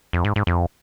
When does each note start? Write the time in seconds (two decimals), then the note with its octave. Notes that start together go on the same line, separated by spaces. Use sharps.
0.13 F2
0.25 G#2
0.36 G#2
0.47 F2